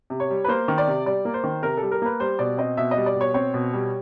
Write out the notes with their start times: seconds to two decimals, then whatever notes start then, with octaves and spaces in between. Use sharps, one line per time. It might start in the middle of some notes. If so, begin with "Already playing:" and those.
0.10 C3
0.20 C#5
0.30 G3
0.44 B4
0.48 A#3 C5
0.68 D#3
0.78 D5
0.87 C3
1.06 G3 D5
1.25 A#3
1.34 C5
1.44 D#3
1.63 C3 A#4
1.77 G3 A4
1.91 A#4
2.02 A#3 B4
2.20 G3 C5
2.39 B2 D5
2.58 C4 D#5
2.77 B2 E5
2.91 D#5
2.97 G3
3.06 D5
3.16 B2
3.21 C#5
3.34 C4 C#5
3.54 B2
3.73 G3